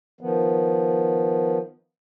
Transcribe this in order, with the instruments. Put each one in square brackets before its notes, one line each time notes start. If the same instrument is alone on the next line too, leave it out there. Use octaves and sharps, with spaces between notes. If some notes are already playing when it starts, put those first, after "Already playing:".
[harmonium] D#3 F3 B3